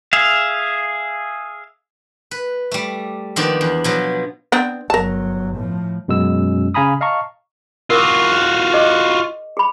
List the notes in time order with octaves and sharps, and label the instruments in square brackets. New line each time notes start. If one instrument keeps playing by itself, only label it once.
[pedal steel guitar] G#4 E5 F5
[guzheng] B4
G3 A3
D#3 F3 A#3 B3 D4
E2
B2 F3 F#3
[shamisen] B3 C4 D4
[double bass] G1 F#3 [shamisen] A#4 A5
[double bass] A2 F3
[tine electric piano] F#2 B2 G#3 C#4 E6
C#3 F5 G#5 A#5 B5 D#6
D#5 F5 A5 A#5 C#6
[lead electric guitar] F4 F#4 [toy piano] A#4 D6
[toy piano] G#4 C5 D#5
G#4 B5